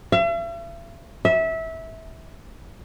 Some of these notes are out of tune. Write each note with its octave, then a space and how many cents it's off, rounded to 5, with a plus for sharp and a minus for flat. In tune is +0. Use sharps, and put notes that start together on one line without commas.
E5 +45
E5 -20